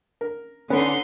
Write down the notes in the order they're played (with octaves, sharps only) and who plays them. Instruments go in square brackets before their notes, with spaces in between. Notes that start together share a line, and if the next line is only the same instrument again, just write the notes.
[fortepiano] A#4
[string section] D3 D#4 C6 [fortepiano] B3 [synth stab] C#4